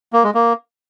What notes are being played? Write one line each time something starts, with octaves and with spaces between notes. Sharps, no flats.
A#3
G#3
A#3